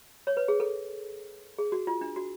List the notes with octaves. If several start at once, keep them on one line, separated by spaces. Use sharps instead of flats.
C#5
B4
G#4
A4
G#4
F#4
F4
D4
F#4